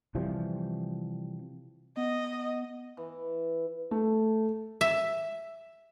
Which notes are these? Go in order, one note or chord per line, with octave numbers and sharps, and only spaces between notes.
C3 E3 F3 G3
B3 D#5
E3
A3
E5